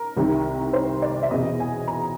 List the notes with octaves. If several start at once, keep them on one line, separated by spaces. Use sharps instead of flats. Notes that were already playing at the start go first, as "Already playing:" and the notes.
Already playing: A#4
C2 C3 D#3
C5
D5
E5
E2 B2 D#5
G#5
A#5